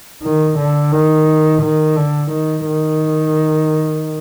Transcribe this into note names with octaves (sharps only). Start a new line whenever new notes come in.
D#3
D3
D#3
D#3
D3
D#3
D#3